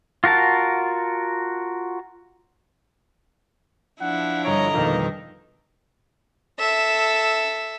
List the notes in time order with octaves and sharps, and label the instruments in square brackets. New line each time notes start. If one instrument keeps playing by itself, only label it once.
[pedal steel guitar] F4 F#4 A#4 A5
[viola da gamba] F3 D4 E4 [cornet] F#5
[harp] G1 D7 [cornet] C#5 [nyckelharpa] D#5 A#5
[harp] F2 B2 [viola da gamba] D#3 [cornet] A#3
[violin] A4 E5